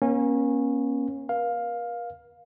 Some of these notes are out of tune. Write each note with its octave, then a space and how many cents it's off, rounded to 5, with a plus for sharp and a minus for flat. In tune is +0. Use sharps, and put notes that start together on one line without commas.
A#3 +35 C#4 -20
A#4 +45 F5 +10